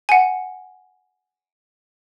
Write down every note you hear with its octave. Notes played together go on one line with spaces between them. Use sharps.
F#5 G#5